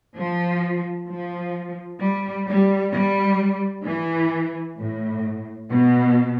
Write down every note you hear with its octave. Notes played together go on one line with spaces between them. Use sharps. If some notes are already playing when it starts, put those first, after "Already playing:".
F3
F3
G3
G3
G3
E3
A2
B2